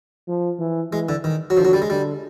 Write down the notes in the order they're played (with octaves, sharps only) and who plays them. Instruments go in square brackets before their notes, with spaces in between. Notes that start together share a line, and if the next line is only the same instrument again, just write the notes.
[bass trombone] F3
E3
[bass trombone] E3 [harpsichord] G#3
[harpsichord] D3
D#3
F#3
[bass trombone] D3 [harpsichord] F3
[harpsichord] F#3
G3
G#3
[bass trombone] D3 [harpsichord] G3